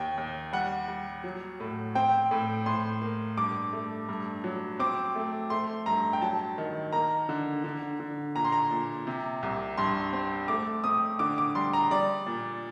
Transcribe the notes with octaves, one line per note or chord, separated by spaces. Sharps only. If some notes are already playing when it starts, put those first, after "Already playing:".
Already playing: D#2 G5
D#2
G3 F#5
G3
F#3
A2
C4 G5
A2
A2 C6
A#3
G2 D6
A3
G2
F#3
C4 D6
A3
A3 C6
G2 A#5
G5
F#3 A5
D#3
A#3 A#5
D3
D3
D3
A#2 A#5
C6
A#5
A#2
C3
C2
G2 C6
C4
A3 D6
C4 D#6
D3 D6
D6
G3 C6
A#5
G3 D5
A#2